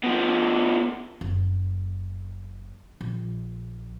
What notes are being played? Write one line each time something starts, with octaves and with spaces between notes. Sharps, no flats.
B2 F3
F#1
A#1